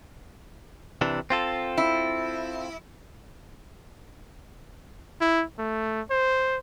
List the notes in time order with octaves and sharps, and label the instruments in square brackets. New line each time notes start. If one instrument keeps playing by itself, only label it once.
[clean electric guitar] C3 E3 D4
C4 F4 A4
[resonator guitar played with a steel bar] E4
[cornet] E4
A3
C5